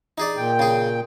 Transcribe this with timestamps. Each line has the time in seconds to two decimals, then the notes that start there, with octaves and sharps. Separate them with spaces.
0.18 D#4 G#4 D5
0.37 A#2 G5
0.59 C#3 G#4